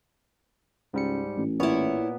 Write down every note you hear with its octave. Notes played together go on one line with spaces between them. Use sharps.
C#2 G#2 G3 C#7
A1
A#2 B3 E4 C#5